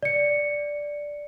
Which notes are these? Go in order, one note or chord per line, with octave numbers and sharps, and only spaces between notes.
D5 C#7